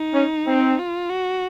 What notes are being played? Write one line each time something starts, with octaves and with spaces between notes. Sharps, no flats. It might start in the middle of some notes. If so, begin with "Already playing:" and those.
Already playing: D#4
C#4
C4
F4
F#4